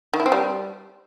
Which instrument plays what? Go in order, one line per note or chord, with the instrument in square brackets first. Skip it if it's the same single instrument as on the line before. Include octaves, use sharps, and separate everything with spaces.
[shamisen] D#3
E4
C4
G3